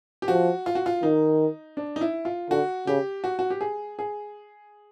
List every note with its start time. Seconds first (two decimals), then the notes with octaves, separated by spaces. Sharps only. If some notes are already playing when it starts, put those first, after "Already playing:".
0.22 G4
0.28 F3 F#4
0.66 F4
0.75 F#4
0.86 F4
1.03 D#3 D#4
1.77 D4
1.96 D#4
2.01 E4
2.25 F4
2.50 D3 F#4
2.87 C#3 G4
3.24 F#4
3.39 F#4
3.50 G4
3.61 G#4
3.99 G#4